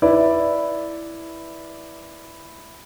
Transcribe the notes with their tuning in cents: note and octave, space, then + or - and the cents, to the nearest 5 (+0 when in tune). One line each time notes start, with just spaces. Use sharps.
E4 +0 B4 +0 D5 +0